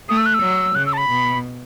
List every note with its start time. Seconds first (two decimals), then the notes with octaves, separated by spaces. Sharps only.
0.09 A3 D#6
0.17 E6
0.26 F#6
0.34 E6
0.42 F#3
0.75 C#3 F#6
0.86 E6
0.93 A5
0.97 B5
1.09 B2